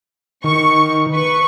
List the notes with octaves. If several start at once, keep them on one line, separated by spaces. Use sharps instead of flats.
D#3 C#6
B4 C#6